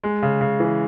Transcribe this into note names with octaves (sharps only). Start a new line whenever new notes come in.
G#3
C#3
C#3
E3